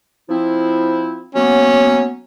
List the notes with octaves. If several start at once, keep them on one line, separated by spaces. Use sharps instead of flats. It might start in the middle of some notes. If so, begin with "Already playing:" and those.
F3 C4 E4
F#3 A#3 B3 C#4